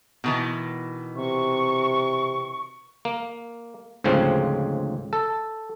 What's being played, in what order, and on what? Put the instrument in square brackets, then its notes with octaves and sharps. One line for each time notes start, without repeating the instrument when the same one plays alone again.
[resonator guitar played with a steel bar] B2 D#3 E3
[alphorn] C3 [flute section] C#6
[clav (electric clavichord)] A#3
D2 G#2 C#3 F3 C4
A4